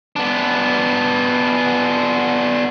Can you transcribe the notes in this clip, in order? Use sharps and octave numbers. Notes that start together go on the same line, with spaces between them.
B3 D4